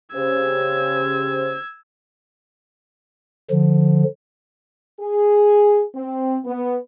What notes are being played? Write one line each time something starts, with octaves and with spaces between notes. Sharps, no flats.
C#3 G4 C5 E6 G#6
D3 F3
G#4
C4
B3